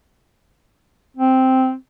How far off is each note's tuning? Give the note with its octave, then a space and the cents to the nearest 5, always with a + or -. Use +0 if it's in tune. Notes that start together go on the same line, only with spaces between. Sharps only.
C4 -5